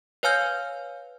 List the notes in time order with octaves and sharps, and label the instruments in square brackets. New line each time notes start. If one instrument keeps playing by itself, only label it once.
[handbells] B4 C#5 F5 G#5 F6 G6